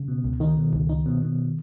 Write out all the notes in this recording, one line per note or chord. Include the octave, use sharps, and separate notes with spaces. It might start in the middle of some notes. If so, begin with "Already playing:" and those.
Already playing: C#3
B2
C#2
D#3 D#4
B2
C#2
D#4
B2
B2